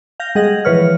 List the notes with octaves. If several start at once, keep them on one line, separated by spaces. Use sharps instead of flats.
F5 G6 A#6
G3 G#3 G#4 D#5 F#5 A#6
E3 F3 B4 C#5 F6